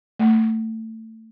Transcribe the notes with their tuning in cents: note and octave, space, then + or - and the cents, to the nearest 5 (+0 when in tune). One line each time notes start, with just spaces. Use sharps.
A3 +20